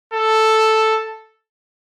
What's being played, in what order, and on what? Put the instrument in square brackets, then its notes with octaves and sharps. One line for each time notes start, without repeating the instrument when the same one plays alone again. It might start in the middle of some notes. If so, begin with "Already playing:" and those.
[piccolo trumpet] A4